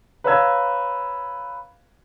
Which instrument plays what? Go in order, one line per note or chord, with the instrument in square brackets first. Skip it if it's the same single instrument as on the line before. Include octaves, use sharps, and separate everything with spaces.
[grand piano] B4 C#5 F5 A#5 E6 G#6